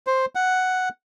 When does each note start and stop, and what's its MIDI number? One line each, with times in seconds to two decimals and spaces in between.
0.07 0.26 72
0.35 0.89 78